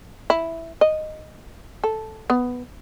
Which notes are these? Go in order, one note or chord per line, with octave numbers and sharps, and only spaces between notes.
E4
D#5
A4
B3